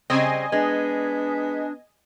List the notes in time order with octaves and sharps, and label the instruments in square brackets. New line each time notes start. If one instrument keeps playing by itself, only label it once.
[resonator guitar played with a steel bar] C#3 G3 C4 [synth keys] D#5 G#5
[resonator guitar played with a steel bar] G#3 [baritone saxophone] B3 [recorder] D4